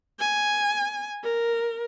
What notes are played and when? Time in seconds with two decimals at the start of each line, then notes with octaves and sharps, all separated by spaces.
0.19 G#5
1.23 A#4